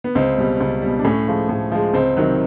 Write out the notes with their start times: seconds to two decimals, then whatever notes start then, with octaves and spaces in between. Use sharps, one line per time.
0.04 B3
0.15 C#2 C4
0.38 B2 G3
0.60 C#2
0.82 B2 G3
0.99 D4
1.05 A2 C#4
1.26 F3 G#3
1.49 A2
1.72 F3 G#3
1.93 C#2 C4
2.17 C3 D#3 F#3